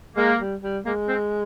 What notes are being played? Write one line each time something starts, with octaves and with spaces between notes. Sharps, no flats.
G#3 A#3
G3
G3
G#3 A#3
C4